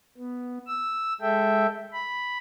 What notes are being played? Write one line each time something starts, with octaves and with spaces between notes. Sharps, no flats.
B3
E6
G#3 A4 E5 G5
B5